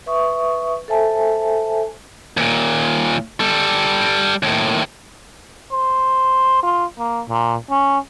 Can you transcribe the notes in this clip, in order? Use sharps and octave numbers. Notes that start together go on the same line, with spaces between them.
B4 E5 C#6 D#6
A4 C5 E5 G#5 A5
D#2 A#2
G3 A4
D#2 A2
C5
F4
A#3
A#2
C#4